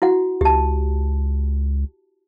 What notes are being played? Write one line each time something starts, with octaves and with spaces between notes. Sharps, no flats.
E4 F#4 F#5
C#2 G4 A5